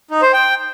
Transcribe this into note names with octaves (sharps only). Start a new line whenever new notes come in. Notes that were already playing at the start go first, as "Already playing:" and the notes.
D#4
C5
G5